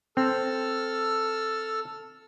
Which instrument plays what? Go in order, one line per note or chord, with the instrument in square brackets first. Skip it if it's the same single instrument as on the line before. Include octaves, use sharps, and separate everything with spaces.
[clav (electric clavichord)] C4 [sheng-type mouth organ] A4 E6 F6